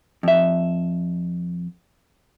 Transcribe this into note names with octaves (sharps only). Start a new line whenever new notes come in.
F2 E5